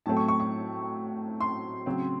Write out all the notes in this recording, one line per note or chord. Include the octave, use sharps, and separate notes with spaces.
A2 F#3 A3 C4 A5
C#6
C#6
C#6
C6
C#3 F#3 C4